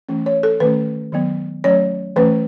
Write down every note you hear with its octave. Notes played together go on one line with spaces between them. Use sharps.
E3 A3 C#4
C#5
A4
D#3 A3 C#4 B4
D#3 F#3 B3
F#3 A3 C#4 C#5
E3 A3 C#4 B4